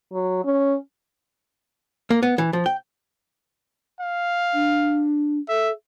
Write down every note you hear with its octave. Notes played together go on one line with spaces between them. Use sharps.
F#3
C#4
A#3
B3
E3
F3
G5
F5
D4
A4 E5